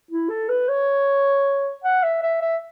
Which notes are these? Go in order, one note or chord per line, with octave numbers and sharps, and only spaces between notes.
E4
A4
B4
C#5
F#5
E5
E5
E5